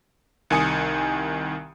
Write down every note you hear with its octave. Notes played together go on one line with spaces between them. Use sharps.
C2 D#3 G#5 D#6 C#7